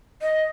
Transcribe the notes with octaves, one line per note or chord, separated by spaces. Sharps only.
D#5